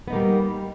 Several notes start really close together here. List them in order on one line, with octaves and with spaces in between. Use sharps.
B3 D#4 A#3 G3